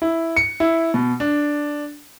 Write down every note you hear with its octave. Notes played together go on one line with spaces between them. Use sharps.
E4
C#7
E4
B2
D4